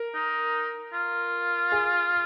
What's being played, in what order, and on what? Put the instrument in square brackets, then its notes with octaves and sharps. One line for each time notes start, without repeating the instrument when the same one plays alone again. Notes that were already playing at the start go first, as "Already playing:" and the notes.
Already playing: [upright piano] A#4
[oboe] D#4
F4
[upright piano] G#4